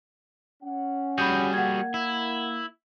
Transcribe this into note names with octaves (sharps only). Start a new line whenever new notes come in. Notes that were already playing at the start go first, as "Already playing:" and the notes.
C#4 F#5
G3 F#4 G#4 B5 G6
A#3 F#5 G#6
E4